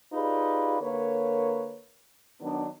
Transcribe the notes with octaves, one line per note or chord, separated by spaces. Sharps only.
D#4 F4 G4 G#4 B4 D5
D3 A#3 A#4 B4 C#5
D#3 F#3 B3 D4